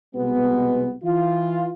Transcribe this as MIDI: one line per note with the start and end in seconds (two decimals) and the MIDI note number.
0.14 0.92 36
0.14 0.92 47
0.14 0.92 56
0.14 0.92 59
1.03 1.70 52
1.03 1.70 65